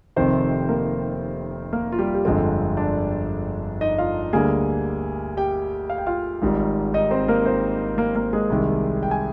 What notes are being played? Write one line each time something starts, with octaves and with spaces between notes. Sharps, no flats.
F1 F2 C3 D#3 C4 C5
A#3 A#4
A#3 A#4
F4
G3 G4
G4
G1 F2 D3 G#3 C4 F4
D4 D5
D#4 D#5
F4 F5
D2 D3 G3 A#3 G#4 G#5
G4 G5
F5
G5
F4 F5
G#1 G#2 G3
D#4 D#5
C4 C5
A#3 A#4
C4 C5
A#3 A#4
A#3 A#4
G#3 G#4
C2 C3 D#3
G5
G#5